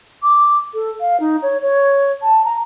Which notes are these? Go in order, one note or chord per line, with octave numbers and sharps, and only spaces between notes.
D6
A4
F5
D#4
C#5
C#5
A5
A#5